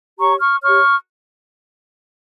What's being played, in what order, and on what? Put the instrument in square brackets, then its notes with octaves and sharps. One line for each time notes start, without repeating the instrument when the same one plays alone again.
[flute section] G4 C#5 A#5 C#6
C#6 F6
G4 C#5 C#6 F6